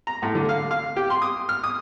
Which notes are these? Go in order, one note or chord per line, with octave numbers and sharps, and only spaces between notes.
A#5
A2
D3
F5
F5
G4
C6
D#6
F6
D#6